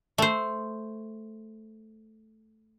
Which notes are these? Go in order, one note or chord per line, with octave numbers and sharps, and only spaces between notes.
A3 C5